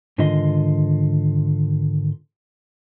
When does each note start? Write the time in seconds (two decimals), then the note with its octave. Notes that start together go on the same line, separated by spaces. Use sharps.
0.18 G#2 D3 D#3 F4 D#5 C6